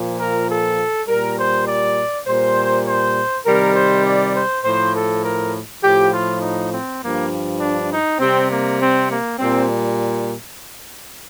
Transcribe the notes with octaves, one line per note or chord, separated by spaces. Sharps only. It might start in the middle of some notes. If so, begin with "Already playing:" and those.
Already playing: A#2 F3
A#4
A4
A#2 G3 A#4
C5
D5
A#2 G3 C5
C5
C3 D#3 G3 A#4
C5
D5
C5
A2 F3 C5
A4
A#4
A2 F3 G4
F4
D#4
C4
G2 F3 A#3
D4
D#4
C3 G3 C4
A#3
C4
A#3
A#2 G3 C4